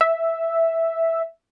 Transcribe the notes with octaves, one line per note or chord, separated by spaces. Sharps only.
E5